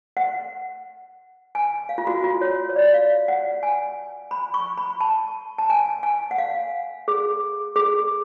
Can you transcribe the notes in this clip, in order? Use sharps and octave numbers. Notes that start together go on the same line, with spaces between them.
F#5
G#5
F5
F4
F#4
F4
C#5
C#5
D5
F5
F#5
G#5
B5
C#6
B5
A5
A5
G#5
G#5
F#5
F5
G#4
G#4